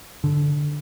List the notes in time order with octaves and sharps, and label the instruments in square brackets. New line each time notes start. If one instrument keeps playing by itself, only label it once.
[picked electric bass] D3